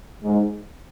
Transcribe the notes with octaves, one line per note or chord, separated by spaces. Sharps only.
G#2